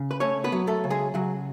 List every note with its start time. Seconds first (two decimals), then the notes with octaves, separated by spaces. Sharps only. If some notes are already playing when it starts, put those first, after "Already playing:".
Already playing: C#3
0.11 B4
0.20 A3 C#4 C#5
0.44 B3 B4
0.52 F#3
0.67 A3 A4
0.84 C#3
0.90 G#3 G#4
1.14 C#3 F#3 F#4